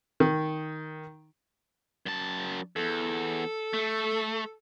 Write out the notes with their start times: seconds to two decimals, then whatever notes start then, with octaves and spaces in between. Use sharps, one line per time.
0.20 D#3
2.06 F#2 A5
2.76 E2 A4
3.73 A3